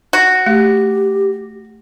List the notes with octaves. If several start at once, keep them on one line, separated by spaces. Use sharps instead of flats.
F#4
A3 G4